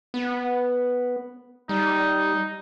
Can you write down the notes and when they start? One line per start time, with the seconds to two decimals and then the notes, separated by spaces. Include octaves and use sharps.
0.14 B3
1.69 G3 D#4